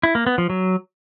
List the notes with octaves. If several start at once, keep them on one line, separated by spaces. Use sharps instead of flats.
E4
A#3
B3
F3
F#3